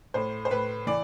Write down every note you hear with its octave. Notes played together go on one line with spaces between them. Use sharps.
A2 C5
C5
A2 B4
E3 D5